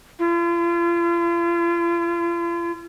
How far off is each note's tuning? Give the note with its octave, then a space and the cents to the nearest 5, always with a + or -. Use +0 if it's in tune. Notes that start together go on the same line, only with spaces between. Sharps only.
F4 -40